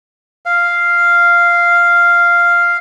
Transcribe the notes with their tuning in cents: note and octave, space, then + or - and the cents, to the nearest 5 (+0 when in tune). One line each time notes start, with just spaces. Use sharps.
F5 -5